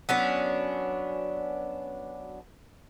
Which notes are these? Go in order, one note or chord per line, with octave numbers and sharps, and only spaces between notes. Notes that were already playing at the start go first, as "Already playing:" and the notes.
F#3 B3 C#4 D4